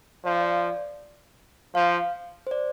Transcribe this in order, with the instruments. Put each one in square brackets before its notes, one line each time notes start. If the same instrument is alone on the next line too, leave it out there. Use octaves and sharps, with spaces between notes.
[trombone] F3 [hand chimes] D5
[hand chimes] F5
D5
[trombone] F3 [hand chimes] F5
[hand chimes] C5
D5